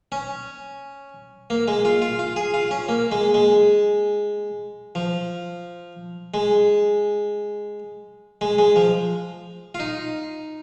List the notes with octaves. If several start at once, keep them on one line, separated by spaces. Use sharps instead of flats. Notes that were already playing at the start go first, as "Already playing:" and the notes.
C#4
A#3
G#3
F4
F4
F4
G#4
F4
C#4
A#3
G#3
G#3
F3
G#3
G#3
G#3
F3
F4
D#4